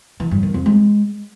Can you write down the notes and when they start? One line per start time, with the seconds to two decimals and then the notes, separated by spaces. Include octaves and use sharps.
0.20 E3
0.31 G2
0.43 D#3
0.54 F2
0.66 G#3